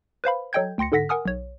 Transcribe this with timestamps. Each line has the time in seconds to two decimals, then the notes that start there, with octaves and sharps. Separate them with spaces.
0.24 B4 C5 F5 B5
0.53 F#3 A4 D#5 G5 G6 G#6
0.78 D2 G5 C6 A#6 C#7
0.92 G#2 D3 A4 F#5 A#6 B6
1.09 A#4 F#5 G#5 D#6 F6
1.25 B1 C#5